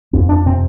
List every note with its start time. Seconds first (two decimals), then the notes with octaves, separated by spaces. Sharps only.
0.13 F2 C4
0.29 D4
0.46 C3 C4